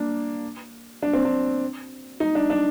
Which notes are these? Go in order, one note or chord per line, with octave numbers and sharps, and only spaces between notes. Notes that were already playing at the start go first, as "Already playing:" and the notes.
Already playing: A#3 D4
D4
C4
D4
D#4
D4
D4